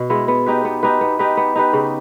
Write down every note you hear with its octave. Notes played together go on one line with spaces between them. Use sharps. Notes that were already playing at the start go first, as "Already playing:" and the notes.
Already playing: B2
G#3 B3 E4
B3
D#4 G4 B4
B3
D#4 G4 B4
B3
D#4 G4 B4
B3
D#4 G4 B4
C#3